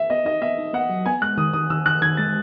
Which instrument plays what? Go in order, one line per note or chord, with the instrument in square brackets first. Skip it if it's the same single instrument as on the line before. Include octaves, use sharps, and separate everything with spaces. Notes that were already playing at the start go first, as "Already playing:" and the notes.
Already playing: [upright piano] E5
[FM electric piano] B3 [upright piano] D#5
[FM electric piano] D#4 [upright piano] D#5
[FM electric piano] B3 [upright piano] E5
[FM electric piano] D#4
[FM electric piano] B3 [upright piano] F#5
[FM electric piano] F#3
[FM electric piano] B3 [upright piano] G#5
[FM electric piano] G#3 [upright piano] F#6
[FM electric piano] D#3 [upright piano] D#6
[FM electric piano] D#3 [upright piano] D#6
[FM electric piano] D#3 [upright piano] E6
[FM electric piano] D#3 [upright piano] F#6
[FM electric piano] D#3 [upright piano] G#6
[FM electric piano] G#3 [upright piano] A6